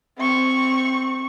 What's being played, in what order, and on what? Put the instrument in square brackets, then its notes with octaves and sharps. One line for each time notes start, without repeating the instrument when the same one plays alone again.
[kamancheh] C4 C#6